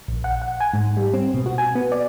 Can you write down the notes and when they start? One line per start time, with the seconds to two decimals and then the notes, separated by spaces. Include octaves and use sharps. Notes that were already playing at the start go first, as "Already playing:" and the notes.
0.08 A#1
0.24 F#5
0.42 F#5
0.60 G#5
0.74 G#2
0.97 G3
1.14 C4
1.34 B2
1.46 F#4
1.58 G#5
1.75 B3
1.92 D5